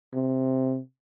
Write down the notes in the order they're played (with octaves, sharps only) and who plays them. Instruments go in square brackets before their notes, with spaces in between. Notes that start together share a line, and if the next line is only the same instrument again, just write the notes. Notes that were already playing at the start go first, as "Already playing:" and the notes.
[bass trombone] C3